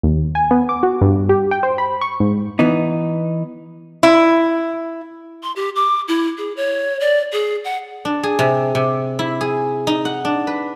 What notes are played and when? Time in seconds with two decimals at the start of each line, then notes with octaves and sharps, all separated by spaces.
0.03 D#2
0.35 G#5
0.51 B3
0.69 D6
0.83 F#4
1.01 G2
1.29 G4
1.51 G5
1.63 C5
1.78 B5
2.01 C#6
2.20 G#2
2.59 E3 B3 D#4
4.03 E4
5.43 C6
5.56 G4
5.76 D6
6.08 E4
6.38 G#4
6.57 C#5
7.00 D5
7.33 G#4
7.65 F#5
8.05 D4
8.23 G#4
8.39 C3
8.75 C3
9.19 E4
9.41 G#4
9.87 D#4
10.05 F#5
10.25 D4
10.47 B4